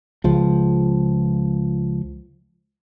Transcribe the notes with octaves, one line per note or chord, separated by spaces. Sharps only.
C#2 F3